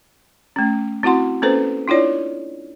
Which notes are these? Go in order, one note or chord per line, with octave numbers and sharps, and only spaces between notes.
A3 C#4
C4 E4 F#4 F#5 C6
A#3 C#4 A4 B4 C5
D4 E4 F4 C#5 D5